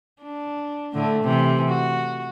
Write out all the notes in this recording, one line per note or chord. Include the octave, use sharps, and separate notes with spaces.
D4
A2 D3 A3
C3 E3
F#4